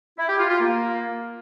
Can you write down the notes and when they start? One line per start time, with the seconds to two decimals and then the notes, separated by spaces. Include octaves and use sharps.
0.18 E4
0.29 G4
0.39 F4
0.49 F4
0.59 A#3